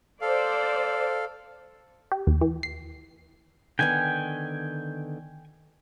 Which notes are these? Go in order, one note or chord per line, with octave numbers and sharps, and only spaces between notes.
A4 C5 D5 F5
G4
D#2
E3
C7
D3 D#3 B3 G5 G#5